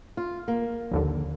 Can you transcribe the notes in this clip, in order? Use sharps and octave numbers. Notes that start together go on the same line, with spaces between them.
F4
A#3
A#1 D#2 D3